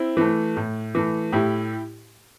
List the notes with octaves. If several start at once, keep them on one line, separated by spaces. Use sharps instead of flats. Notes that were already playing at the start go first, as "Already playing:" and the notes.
Already playing: C4 E4
E3 A3
A2
E3 A3
A2 E4 G4